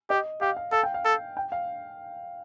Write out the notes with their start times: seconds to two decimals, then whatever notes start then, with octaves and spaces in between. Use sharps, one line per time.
0.10 G4 D#5
0.41 G4 F5
0.57 F5
0.72 A4 F5
0.83 G5
0.94 F5
1.05 A4
1.37 G5
1.52 F5